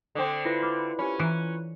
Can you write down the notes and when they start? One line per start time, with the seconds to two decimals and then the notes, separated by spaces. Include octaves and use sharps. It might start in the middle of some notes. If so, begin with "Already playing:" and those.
0.15 D3 C4 G5 D6 D#6
0.45 E4 F4 B4 A#6
0.63 B5 D6 F6
0.99 C#4 G4 C5 B5
1.19 E3 A#5 F#6